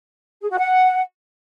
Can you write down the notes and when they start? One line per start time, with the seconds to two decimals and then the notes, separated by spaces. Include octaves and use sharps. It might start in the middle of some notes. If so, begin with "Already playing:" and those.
0.41 G#4
0.50 F#4
0.58 F#5